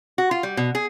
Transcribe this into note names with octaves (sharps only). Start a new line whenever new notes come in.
F#4
F4
G3
B2
G#4